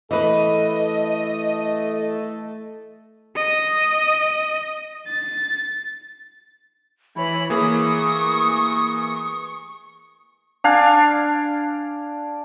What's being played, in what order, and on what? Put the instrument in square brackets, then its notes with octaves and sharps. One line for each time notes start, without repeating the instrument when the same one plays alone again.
[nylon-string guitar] E3 B4 [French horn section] A3 A4 [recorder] D#5
[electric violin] D#5
A6
[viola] E3 C#5 [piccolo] B5
[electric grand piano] E3 A#3 G#4 [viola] C#6 [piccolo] D#6
[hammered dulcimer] D4 F5 G#5